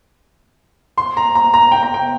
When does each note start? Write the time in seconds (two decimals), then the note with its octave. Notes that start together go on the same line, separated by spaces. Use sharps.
0.98 C6
1.17 A#5
1.35 A#5
1.54 A#5
1.72 G5
1.83 A#5
1.94 G5